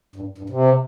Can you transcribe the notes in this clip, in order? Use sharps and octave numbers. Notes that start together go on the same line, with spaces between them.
G2
G2
C3